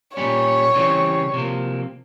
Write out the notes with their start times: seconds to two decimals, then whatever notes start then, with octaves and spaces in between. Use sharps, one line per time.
0.17 A#2 G3 C#4 C#5
0.75 C#3 E3 G3 C4
1.34 C3 F3 A#3